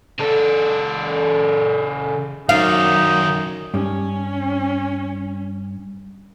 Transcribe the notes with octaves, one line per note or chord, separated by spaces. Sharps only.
C#3 A4
F#2 D#3 D#4 D5 F5
G2 C#4